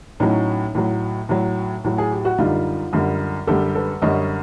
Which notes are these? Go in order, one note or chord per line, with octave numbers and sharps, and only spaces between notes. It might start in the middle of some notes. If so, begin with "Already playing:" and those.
A2 F#3 C#4 D#4
A2 F#3
A2 F#3
A2 F#3
G#4
G4
F#4
F#2 D3 G3 D#4 F4
F#2 D3 G3
F#2 D3 G3 G4 A4
A4 B4
F#2 D3 G3 C#5 D#5